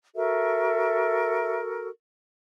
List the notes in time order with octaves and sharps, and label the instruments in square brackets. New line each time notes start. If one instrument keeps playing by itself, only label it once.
[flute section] F#4 A4 A#4 [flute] E5